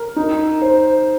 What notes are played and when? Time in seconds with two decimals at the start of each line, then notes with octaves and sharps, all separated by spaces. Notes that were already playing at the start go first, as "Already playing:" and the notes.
Already playing: A#4
0.16 D#4
0.62 C5